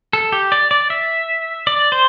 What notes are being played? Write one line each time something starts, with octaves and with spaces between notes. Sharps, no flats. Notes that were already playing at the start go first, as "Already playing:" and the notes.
A4
G4
D5
D5
E5
D5
C5